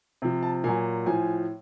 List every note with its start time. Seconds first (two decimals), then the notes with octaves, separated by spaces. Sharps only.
0.22 C3 F3
0.43 A5
0.64 A#2 F#3 G#5
1.06 A2 F3 G#5